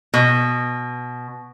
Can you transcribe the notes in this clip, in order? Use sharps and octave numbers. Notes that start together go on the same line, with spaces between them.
B2